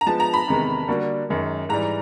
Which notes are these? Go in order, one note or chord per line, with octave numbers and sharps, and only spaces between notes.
A#5
F3 G#3 B3 A5
A#5
B5
E2 C3 D#3 G#3
D3 G3 A#3 D4 F#4
F#2 D#3 G#3
G#2 E3 G3 A#5